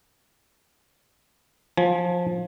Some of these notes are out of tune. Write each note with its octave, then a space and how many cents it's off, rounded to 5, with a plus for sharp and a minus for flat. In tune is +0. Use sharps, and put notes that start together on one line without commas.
F3 +15 G#5 +30